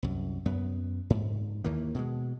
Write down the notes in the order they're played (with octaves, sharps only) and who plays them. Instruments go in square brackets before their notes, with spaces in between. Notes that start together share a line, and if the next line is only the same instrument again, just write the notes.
[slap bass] C2 F#2
F#2 B3
G#2
D#2 D#3 E3 A#3
B2 G#3